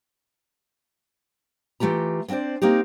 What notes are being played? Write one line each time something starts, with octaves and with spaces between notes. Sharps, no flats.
E3 A3 F4 G4 A#5
B3 C4 D4 C5 D5
A#3 C4 D#4 G4